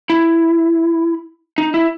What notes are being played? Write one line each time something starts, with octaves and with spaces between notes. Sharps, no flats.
E4
D#4
E4